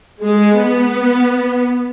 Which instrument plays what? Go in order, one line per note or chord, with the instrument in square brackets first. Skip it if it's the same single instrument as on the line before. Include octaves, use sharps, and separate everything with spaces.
[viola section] G#3
B3